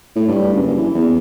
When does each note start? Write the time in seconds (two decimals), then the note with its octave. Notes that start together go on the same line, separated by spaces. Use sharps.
0.15 A2
0.28 G2
0.53 F#1
0.78 E3
0.94 E2